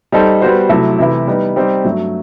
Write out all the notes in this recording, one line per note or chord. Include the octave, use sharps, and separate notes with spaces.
G3 D#4 A4 C5
G3 B3 F#4 C5
C3 F#3 A3 E4 A4
C3 E3 A3 E4
G3 B3 D#4
G3 C4 D#4 G4
G2 F#3 A3